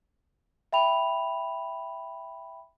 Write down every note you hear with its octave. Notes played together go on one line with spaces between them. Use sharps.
E5 G5 B5 F7